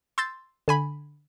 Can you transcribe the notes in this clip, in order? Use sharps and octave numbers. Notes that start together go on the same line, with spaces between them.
C6 E6 G6 A6
D3 G#5 B5